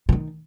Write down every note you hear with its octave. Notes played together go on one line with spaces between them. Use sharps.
C#3
D#3